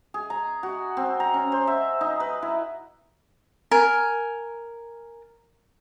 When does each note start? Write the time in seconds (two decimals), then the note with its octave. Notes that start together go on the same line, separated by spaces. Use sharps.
0.14 G#4
0.30 A#5
0.63 F#4
0.97 C4
1.20 A#5
1.34 C#4
1.52 C5
1.67 E5
2.01 D#4
2.20 B4
2.42 E4
3.71 A#4 G#5